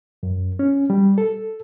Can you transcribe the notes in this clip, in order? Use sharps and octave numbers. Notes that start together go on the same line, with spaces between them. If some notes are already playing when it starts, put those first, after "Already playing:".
F#2
C#4
G3
A4